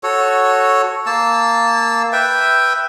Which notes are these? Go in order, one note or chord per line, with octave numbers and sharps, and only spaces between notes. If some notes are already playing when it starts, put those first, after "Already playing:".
F#4 A4 C#5
A#3 A5 E6
B4 E5 G5